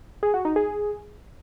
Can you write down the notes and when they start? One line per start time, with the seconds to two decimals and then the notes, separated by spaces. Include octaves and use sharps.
0.23 G#4
0.34 F#4
0.45 D#4
0.56 G#4